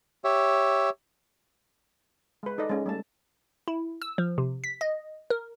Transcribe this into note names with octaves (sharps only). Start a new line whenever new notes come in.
G4 C#5 E5
G#3 B4
D#4 A4 D5 D#5
G#3 C#4
G3 A3 A5
E4
E6
F3
C3
B6
D#5
A#4